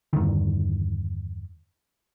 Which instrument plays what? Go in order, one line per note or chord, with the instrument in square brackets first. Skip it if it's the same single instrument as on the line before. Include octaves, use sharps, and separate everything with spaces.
[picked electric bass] E2 G2 D3 D#3